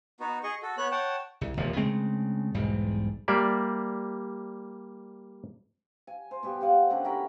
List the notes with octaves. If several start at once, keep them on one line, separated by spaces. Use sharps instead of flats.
B3 D#4 F#4
G#4 D#5 C#6
F#4 A4
B3 C#5 F#6
C#5 F#5 G5 A5
C2
D#1 D#2 F3
C#3 G#3 A3 C4
B1 E2 G#2 G3
G3 A#3 D5 E5
G#5
C5
B2 G3 G4
C5 F5 F#5 G#5
D3 C#4 G4 A4
E4 F#4 A#4 B5